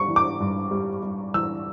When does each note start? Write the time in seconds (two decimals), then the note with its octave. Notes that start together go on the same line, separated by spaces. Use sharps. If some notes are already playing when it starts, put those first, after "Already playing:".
Already playing: G3 C#6
0.08 E3
0.16 D6
0.40 G2
0.71 G3
1.03 G3
1.34 E3 E6